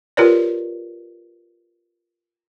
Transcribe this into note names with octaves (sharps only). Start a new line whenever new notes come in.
F4 G4 A#4 B4 C#5 D5